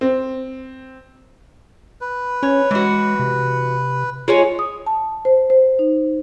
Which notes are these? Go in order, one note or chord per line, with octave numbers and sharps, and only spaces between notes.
C4
B4
C#4 C#5
E3 G#3 F#4
C3
G#3 F4 C#5 G#5
D#6
A5
C5
C5
D#4